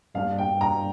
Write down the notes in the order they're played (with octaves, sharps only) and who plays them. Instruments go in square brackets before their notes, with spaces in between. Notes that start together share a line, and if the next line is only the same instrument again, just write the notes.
[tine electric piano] G2 G3 A#3 D4 [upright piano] F5
[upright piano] G5
A#5